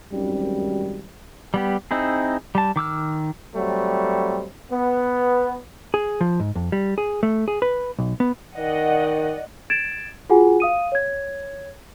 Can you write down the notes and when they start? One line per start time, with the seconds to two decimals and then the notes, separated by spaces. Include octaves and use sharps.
0.12 G#1 F#2 G3
1.54 G3 B3 G4
1.91 C4 D#4 E4 G#4
2.55 G3 A5
2.76 D#3 D6 E6 F6
3.55 F#3 G3 A3 C4
4.71 B3
5.94 G#4
6.21 F3
6.40 G#2
6.56 F2
6.72 G3
6.98 G#4
7.23 A3
7.48 G#4
7.62 B4
7.99 B1
8.20 B3
8.58 D#3 D5 D#5 F#5
9.70 G#6 A6 D7 E7
10.30 F4 F#4 G#4 F#5 G#5
10.60 F5 D#6 D#7
10.92 C#5 G#6